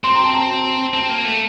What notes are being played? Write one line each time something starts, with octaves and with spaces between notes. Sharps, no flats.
C4 C6
A#5
A5
A#5
C4 A5
A#3
A3